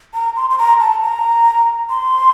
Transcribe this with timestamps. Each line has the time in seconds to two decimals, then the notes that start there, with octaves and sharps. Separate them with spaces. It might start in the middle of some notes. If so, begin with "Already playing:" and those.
0.14 A#5
0.36 C6
0.50 C6
0.58 A#5
0.80 A5
1.02 A#5
1.90 C6